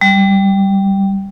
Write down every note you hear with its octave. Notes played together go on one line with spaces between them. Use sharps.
G3